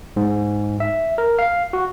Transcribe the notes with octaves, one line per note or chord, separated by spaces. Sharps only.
G#2
E5
A#4
F5
F#4